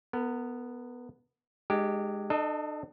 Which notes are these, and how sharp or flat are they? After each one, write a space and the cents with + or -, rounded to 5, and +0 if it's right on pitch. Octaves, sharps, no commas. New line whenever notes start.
B3 +0 A#4 -35
G#3 +0 D4 +45 G4 -5
D4 +40 A4 +0 D#5 +0